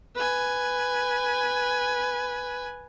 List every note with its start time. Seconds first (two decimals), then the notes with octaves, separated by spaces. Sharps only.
0.15 B4 G#5